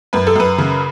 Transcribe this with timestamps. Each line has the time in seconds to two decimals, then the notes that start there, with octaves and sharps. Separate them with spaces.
0.13 F#2 B4
0.27 A4
0.36 F#2 B4
0.58 C#3